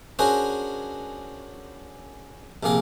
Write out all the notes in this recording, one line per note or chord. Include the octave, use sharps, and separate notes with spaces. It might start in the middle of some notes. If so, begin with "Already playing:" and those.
C#4 D4 F#4 G#4 A#4 C5
A#1 C3 A#3 G#4 F5